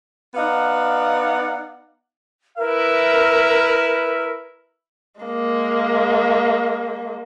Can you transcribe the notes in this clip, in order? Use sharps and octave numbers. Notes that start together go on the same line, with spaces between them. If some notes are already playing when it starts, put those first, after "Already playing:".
B3 D#4 D5 F5 F#5
E4 A#4 B4 E5
G#3 A#3